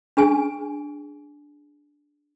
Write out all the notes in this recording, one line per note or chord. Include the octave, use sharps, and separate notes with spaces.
D4 G#4 G#5